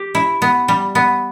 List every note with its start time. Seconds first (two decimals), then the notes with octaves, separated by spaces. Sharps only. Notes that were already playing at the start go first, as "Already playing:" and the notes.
Already playing: G4
0.15 E4
0.42 B3
0.68 G3
0.95 B3